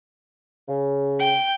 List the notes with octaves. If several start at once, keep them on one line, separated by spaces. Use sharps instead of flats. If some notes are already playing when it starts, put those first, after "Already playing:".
C#3
G5